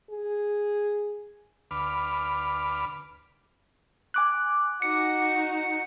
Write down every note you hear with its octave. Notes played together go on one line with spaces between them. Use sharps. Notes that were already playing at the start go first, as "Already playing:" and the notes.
G#4
D2 B4 D6 F6
G#5 D6 F#6
D#4 F#4 C#7